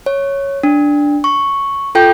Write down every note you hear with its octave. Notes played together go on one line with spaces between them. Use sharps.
C#5
D4
C#6
F4 A4 G5 G6